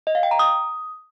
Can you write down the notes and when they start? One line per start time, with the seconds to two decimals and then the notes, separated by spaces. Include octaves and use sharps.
0.07 D#5
0.15 F5
0.23 G5
0.31 A#5
0.39 D#6